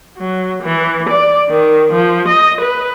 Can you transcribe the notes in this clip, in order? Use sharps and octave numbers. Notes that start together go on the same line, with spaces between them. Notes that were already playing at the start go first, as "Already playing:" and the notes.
F#3
E3
D5
D#3
F3
D#5
B4